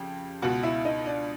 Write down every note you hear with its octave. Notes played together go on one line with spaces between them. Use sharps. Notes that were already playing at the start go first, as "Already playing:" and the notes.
Already playing: F2 C#3 G4
C#2 B2 F#4
E4
D#4
D4